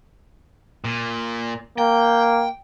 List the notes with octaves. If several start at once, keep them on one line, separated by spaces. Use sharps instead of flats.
A#2
A#3 G5